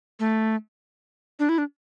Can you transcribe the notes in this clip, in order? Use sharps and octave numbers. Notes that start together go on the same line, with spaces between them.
A3
D4
E4
D4